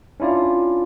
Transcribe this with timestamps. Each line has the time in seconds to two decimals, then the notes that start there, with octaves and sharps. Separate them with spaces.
0.20 C#4 D4 E4 F4 D5